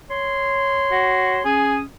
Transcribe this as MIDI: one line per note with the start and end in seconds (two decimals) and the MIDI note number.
0.10 1.41 73
0.10 1.41 84
0.91 1.38 66
1.45 1.82 61
1.45 1.77 68
1.45 1.82 87